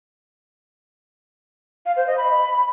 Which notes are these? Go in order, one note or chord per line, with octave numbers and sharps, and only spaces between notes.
F5
C5
D#5
B5